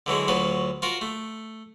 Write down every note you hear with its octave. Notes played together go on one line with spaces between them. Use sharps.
D3 E3 F#3 G#3
D2 F#3 F4 B4
F4 F#4 A#4
A3